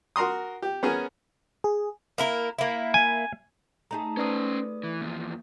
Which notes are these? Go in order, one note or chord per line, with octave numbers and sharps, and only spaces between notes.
F#4 A#4 A#5 C6 D#6
G4
B3 C#4 G#4 A#4
G#4
A#3 E4 A#4
A#3 E4
G#5
A3 D#4 G#4 A5 A#5
C#4 B4 C5 D5 D#6
E3
E2 D#3 F3 A#3